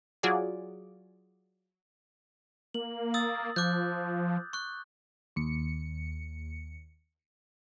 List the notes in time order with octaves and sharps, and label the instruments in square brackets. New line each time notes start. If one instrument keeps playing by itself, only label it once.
[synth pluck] F#3 F4 F#4 G#4 D5
[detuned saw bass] A#3 [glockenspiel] F#7
[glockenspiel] D#6 E6 A6
[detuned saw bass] F3 [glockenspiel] D6 F#6 G6
[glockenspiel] C#6 F#6
[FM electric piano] D#2 C#7